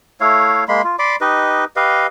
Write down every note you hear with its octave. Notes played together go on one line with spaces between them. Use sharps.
A3 E4 C#5 F5
G#3 A#3 B5 C6
F4
D5 B5 C6 D6
D#4 G4 B4 D#5
G4 B4 D#5 F5